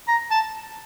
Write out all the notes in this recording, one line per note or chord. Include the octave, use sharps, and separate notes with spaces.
A#5
A5